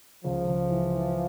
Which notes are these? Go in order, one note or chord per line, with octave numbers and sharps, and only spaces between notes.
C#2 F3
C#2
E3
E3